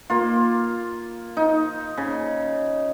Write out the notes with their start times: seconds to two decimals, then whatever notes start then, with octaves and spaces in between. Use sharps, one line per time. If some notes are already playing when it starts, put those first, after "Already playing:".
0.10 A#3 F4
1.37 D#4
1.97 C#3